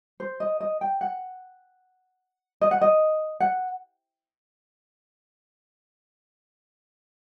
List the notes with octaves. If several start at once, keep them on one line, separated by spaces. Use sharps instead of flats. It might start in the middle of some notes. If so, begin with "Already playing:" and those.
C5
D#5
D#5
G5
F#5
D#5
F#5
D#5
F#5